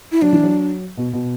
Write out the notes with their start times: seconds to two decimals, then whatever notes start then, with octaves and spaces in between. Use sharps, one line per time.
0.12 E4
0.22 F#3 D4
0.33 E3
0.44 F#3
0.97 B2
1.13 B2